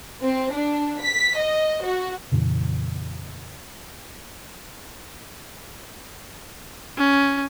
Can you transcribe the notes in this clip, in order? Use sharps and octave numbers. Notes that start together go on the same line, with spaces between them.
C4
D4
B6
D#5
F#4
F2 A#2 C#3 E3
C#4